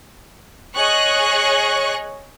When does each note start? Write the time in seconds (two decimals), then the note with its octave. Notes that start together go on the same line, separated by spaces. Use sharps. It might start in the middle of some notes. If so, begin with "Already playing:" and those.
0.76 G#4 C#5 D#5 C#6 F#6